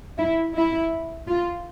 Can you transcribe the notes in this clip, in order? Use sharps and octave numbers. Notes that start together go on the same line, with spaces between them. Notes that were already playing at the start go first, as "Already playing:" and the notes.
E4
E4
F4